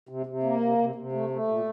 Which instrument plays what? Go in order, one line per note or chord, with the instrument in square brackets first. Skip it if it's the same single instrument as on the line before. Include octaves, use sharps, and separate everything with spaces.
[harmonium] C3
C3
A#3
C3
C3
C3
A3
A3
A#2